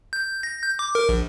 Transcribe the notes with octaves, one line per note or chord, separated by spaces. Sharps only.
G6
A#6
G6
D6
A#4
A#1